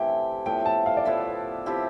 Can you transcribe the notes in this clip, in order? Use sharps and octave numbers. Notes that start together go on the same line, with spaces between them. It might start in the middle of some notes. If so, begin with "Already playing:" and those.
Already playing: E3 A3 C4 G4 G5
A2 F3 B3 E4 G5
A5
F5
D5
A2 F3 B3 E4 E5
F3 C4 E4 G4